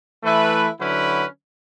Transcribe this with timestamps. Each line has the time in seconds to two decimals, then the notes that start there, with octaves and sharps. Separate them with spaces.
0.23 E3 A3 E4 B4
0.79 D3 F#3 C#4 E4 B4